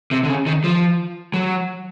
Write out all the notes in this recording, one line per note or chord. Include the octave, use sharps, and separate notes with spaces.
C3
D3
C#3
D#3
F3
F#3